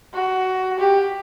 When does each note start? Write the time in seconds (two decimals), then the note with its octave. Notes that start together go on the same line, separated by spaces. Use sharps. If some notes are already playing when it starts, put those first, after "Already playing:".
0.14 F#4
0.79 G4